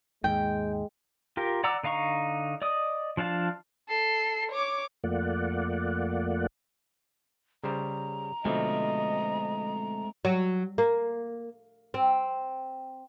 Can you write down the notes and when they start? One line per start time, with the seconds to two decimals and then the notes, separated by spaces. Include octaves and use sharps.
0.24 D#2 G#2 G#3 G5
1.37 F4 G4 A#4
1.64 D5 F#5 A#5 D6 E6
1.83 D3 D#4 F5 A#5 C#6
2.62 D5 D#5 D#6
3.17 F3 D4 F5 A5
3.89 A4 C7
4.51 C#5 D6
5.04 F2 A3 A#3 F4 D5 F#5
7.64 C#3 G3 C5 A#5
8.45 B2 D3 F3 G#3 A3 C4 D#5
10.25 F#3
10.78 A#3
11.94 C4